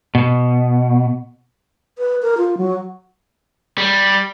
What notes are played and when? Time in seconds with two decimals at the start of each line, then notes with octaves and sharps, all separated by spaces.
0.15 B2
1.98 B4
2.22 A#4
2.38 F4
2.57 F#3
3.78 G3